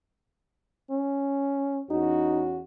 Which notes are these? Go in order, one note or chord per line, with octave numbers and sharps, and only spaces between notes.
C#4
E2 C#4 D#4 F#4